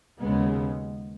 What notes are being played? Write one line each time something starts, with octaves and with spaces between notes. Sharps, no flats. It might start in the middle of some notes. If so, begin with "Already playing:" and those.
D#2 C#3 G#3 B3